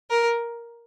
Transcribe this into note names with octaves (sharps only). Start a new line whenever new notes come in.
A#4